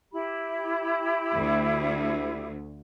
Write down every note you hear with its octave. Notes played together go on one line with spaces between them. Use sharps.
E4 G4 B5
D2